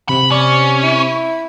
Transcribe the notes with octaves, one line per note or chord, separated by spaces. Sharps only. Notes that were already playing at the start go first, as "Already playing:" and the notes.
C3 B5
C#4 D5
E4